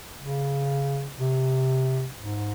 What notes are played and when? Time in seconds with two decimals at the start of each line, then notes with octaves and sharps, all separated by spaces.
0.19 C#3
1.18 C3
2.17 G#2